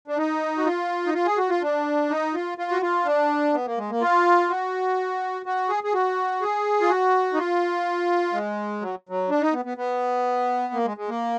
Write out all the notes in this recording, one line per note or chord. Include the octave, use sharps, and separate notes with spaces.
D4
D#4
F#4
F4
D#4
F4
G#4
F#4
F4
D4
D#4
F4
F4
F#4
F4
D4
B3
A#3
G#3
A#3
F4
F#4
F#4
G#4
G#4
F#4
G#4
F4
F#4
D#4
F4
G#3
F#3
F#3
D4
D#4
B3
B3
B3
A#3
G#3
G#3
A#3